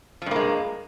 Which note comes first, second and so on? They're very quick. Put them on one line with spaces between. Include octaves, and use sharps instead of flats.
F3 G2 A#3 G#3